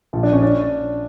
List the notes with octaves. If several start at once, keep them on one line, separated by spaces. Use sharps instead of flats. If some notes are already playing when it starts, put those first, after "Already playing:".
A#1 F4
D4
A#1 C#4
D4